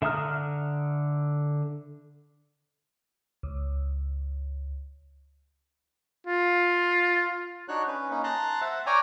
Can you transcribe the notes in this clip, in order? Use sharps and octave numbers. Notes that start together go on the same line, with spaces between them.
D3 E5 A#5 D#6 F6
C#2
F4
D4 D#4 F#4 C#5 F#6
C#4 B4
A#3 C#4 D#4
A5 A#5 C6 F#6
C5 E5 F#5
C#5 D5 G5 G#5 A#5